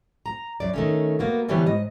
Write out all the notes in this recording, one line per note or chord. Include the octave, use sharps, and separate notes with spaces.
A#5
F#2 D5
D#3 A3 C#4
A#3 B3 F#4
D3 E3 G3 B3 G4 C#5
G#2 D#5